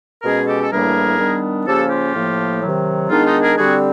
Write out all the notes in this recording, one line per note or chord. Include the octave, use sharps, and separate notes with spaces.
B2 G#3 C#4 G#4 A#4
G4 A4
A4
A2 E3 G3 A#3 D4 G#4 A#4
D#3 G3 B3 D4
C#3 F3 A#3 C#4 G4 A4
F4 G4
A2 F3 A#3
C3 D#3 F#3
D#3 G#3 B3 D4 D#4 F4
D#4 F4
G#4 A#4
D3 G3 C4 F#4 G#4